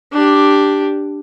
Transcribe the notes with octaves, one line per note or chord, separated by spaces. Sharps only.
D4 G4